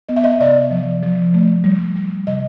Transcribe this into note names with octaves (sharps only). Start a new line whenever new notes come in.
B3 D#5
E5
D#5
C3 D5
F3
F3
A3
G3
G3
C3 D#5